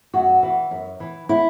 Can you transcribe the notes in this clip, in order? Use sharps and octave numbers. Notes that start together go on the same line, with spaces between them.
F#2 F#4
E3
F#2
E3
E4